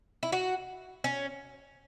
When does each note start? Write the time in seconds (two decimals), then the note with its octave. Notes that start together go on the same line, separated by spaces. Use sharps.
0.23 E4
0.32 F#4
1.04 C#4